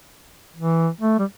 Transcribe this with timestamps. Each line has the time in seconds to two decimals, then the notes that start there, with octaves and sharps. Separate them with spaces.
0.57 E3
1.01 A3
1.19 G3